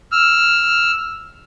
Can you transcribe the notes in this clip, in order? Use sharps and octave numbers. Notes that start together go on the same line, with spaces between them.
E6 F6